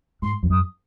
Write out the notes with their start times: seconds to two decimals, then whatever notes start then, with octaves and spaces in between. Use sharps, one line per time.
0.22 G#2 C6
0.43 F2
0.50 F#2 D#6